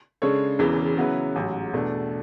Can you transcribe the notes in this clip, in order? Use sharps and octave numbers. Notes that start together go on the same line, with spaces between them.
C#3 G#3 D4 A4 C#5
E1 E2 C#3 E3
C#3 F#3 B3 E4 B4
A1 G#2 F#3
E2 B2 A3 D4